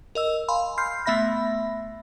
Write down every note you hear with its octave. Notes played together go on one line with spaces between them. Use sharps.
A#4 D#5 E6
F5 G#5 B5 C6
C6 F6 G6 C7
A3 B3 E5 B5 A#6